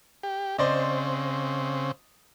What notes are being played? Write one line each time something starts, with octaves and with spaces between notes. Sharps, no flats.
G4
C#3 C4 C5 D5 D#5